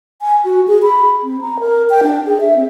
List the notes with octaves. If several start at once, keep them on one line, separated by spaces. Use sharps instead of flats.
G#5
F#4
G#4
B5
C4
A#5
A#4
G5
D4
G#4
E5
C4